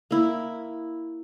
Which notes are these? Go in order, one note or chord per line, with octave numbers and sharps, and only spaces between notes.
A#3 E4